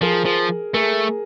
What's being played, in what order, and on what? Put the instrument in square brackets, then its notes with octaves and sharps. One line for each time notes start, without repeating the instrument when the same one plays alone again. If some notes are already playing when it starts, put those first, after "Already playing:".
[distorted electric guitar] F3 [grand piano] G#4 A#4
[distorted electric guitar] F3
[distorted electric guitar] A3 [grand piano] G#4 A#4